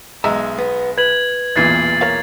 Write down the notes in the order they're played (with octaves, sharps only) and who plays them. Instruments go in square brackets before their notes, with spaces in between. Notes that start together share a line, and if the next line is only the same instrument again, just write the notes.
[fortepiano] B1 G#3 [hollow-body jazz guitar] E5 A#5
[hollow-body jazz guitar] B3
[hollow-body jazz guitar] B4 [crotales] G#6 F#7
[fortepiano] B1 E2 A#2 [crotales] G#6 A6 C7
[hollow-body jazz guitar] A#4 C#5 F5